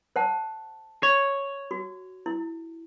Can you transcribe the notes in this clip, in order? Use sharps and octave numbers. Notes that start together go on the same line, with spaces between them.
C5 F#5 A5
C#5
F#4
E4